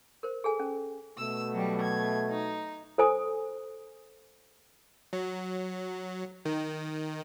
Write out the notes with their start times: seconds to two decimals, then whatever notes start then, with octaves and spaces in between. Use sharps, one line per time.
0.23 A#4 C5
0.44 G#4 A4 G#5
0.60 C#4
1.18 B2 A3 E6
1.53 F#3 G3
1.82 G#6
2.30 D#4
2.98 A4 C5 G#5 D#6
5.13 F#3
6.45 D#3